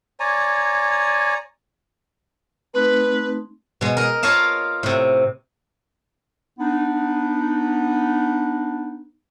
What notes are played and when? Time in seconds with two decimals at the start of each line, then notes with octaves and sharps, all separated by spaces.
0.20 C#5 D5 G#5 A#5
2.74 A3 C4 D#4 B4
3.81 B2 G#3
3.97 A#4 D#5
4.23 F4 A#4 C#5 D#5 F5 A5
4.83 A2 C3
6.59 B3 D4 D#4